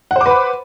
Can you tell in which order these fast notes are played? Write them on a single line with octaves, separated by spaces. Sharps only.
F#5 C5 D6 B4 B5